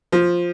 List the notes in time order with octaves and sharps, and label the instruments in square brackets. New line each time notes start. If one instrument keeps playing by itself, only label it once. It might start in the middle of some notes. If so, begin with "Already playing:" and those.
[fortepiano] F3